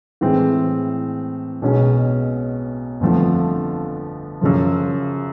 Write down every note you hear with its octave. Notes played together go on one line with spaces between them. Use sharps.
A2 E3 G#3 C4
B1 B2 G#3 C#4
G1 F2 D3 F3 A3
F#2 C#3 F3